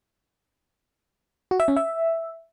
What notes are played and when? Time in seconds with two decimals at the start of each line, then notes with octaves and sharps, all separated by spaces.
1.51 F#4
1.60 E5
1.68 C#4
1.76 E5